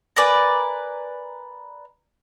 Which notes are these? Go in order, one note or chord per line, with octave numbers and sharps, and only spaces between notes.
A#4 B4 D5 G#5